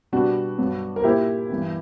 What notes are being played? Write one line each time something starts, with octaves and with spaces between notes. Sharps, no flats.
B2 G3 B3 D4 F#4
G2 F#3 B3
A#4
A#2 A#3 E4 G4
G2 E3 B3